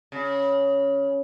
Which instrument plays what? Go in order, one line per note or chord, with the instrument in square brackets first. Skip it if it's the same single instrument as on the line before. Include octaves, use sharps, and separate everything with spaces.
[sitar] C#3